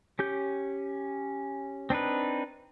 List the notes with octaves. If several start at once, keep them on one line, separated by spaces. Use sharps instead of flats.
C#4 G4 G6
C4 D4 D#4 B4